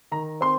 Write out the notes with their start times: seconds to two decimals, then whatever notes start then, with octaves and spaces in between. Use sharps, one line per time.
0.12 D#3 A#5
0.41 C4 C6